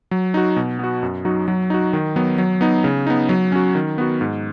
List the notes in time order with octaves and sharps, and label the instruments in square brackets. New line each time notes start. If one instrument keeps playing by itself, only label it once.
[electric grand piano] F#3
D#4 F#4
B2
B3 F#4
F#2
F#3 D#4 F#4
F#3
D#4 F#4
D#3
F#3 B3
F#3
B3 D#4
C#3
B3 D#4
F#3
C#4 F#4
D#3
B3 F#4
G#2